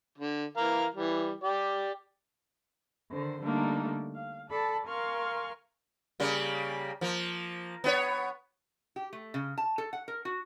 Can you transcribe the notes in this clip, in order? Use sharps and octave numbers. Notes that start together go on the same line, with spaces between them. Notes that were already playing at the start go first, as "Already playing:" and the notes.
D3
E3 A#4 F5
E3 G3
G4 D5
D3 D#3 C5
D3 G3 A3 A#3 D4 D#4
F5
A4 D5 A5 B5
A#4 F5 G#5 C6 C#6 F6
C#3 G3 A#3
F3 A#3
B3 E4 C#5
G4
A3
C#3
A5
A4
F#5
A#4
F#4